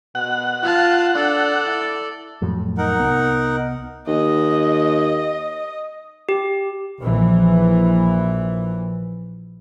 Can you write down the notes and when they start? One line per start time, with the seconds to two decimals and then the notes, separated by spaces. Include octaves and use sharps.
0.15 B2 F#5
0.63 F4 F5 A5
1.15 D4 A4 D5
1.65 E4
2.42 F2 A2 F#3
2.78 D#4 A#4 F#5
2.99 C2 B3
4.07 D#2 D#5
6.29 G4
7.00 A#1 E3